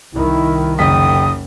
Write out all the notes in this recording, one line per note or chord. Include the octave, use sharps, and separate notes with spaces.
C2 D#3 E4
F#1 G5 D#6 B6